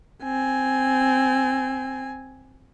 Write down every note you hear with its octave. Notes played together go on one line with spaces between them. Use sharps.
C4 G#5